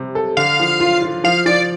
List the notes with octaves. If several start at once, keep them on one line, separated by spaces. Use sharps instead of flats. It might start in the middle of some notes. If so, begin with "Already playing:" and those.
Already playing: C3 G3
A4
D3 F5
F3
F4
F4
F3 F5
F3 D5